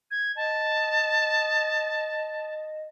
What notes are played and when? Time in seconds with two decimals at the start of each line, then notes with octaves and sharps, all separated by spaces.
0.11 G#6
0.36 D#5 A5